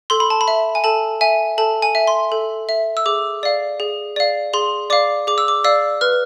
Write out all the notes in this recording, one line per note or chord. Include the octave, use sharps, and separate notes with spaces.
A4 C6
B5
A5
B5
E5
G#5
A4 A5
E5 G#5
A4 A5
G#5
E5
C6
A4
E5
E6
G#4 D6
D5 F5
G#4
D5 F5
G#4 C6
D5 F5 D6
G#4 D6
E6
D6
D5 F5 E6
B4 F6